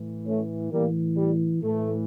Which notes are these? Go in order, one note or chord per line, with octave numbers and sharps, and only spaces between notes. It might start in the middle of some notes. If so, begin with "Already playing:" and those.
Already playing: A2 E3
A3 C#4
A2 E3 G3 A#3
G3
A2 E3 A3